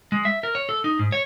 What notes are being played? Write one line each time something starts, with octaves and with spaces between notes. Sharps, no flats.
G#3
E5
A#4
C#5
A4
D#4
G#2
C#5